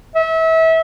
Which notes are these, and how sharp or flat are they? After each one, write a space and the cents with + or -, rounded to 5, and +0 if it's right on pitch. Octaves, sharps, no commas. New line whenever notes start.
E5 -30